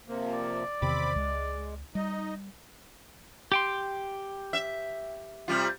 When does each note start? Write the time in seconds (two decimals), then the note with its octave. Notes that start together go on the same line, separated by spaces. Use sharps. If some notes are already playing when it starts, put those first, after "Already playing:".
0.09 C3 F3 A#3
0.33 D5
0.82 E2 C3 D#3 C4 B5 D6
1.16 C#2 G#3
1.95 G3 D#4 D#5
3.52 G4 G5 C6
4.53 E5
5.48 C3 G3 F4